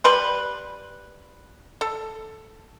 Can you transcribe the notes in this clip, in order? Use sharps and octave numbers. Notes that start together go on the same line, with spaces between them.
G3 B4 C6
A4